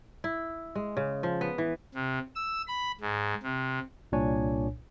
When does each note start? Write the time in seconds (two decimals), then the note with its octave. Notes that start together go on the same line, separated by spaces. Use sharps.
0.24 E4
0.75 G#3
0.97 C#3
1.23 F3
1.41 B3
1.58 E3
1.94 C3
2.35 E6
2.68 B5
3.01 G#2
3.43 C3
4.12 C2 A#2 D4 C#5 G#5